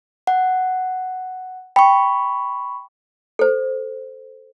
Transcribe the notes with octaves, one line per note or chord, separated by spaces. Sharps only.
F#5
G5 B5 C#6
A4 C5